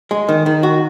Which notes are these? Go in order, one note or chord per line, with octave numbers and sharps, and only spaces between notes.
G#3
D#3
D#3
F#4